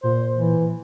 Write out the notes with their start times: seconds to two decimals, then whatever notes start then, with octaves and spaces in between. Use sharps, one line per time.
0.03 A#2 C5
0.36 E3